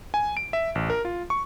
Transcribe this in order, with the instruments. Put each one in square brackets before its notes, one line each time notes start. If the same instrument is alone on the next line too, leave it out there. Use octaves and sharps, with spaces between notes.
[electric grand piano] G#5
D7
E5
A1
A#4
F4
C#6